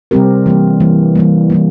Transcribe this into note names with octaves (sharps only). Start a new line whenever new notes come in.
C3 G3 C4 G4 A#4
E3 G3 A#3
E3 G3 A#3
E3 G3 A#3
E3 G3 A#3